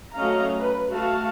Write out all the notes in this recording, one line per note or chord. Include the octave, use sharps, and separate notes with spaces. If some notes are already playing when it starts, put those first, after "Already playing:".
F#3 A3 C#4 D#5 F5 A#5
B4
A3 F#4 F5 A5